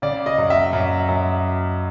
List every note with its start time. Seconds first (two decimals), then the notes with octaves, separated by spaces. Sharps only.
0.02 C#3 D5
0.26 D#5
0.38 F#2
0.50 E5
0.73 F#2
1.09 F#2